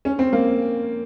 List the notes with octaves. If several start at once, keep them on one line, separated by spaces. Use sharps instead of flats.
C#4
C4
A#3